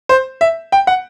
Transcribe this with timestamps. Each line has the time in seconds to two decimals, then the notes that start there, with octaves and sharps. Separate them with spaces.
0.09 C5
0.41 E5
0.72 G5
0.87 F#5